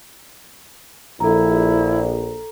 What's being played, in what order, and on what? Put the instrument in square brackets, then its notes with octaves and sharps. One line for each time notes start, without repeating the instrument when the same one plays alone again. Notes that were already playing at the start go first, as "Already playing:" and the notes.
[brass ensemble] A#1 [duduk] E4 [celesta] A4 A#5